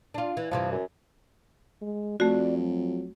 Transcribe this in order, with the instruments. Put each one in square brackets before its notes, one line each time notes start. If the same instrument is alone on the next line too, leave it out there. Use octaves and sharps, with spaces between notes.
[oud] D4 F4
E3
[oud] G2 C3 E3 [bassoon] F3
[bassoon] F#2
[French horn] G#3
[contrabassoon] F2 [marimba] A3 F#4 [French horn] D5
[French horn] F#3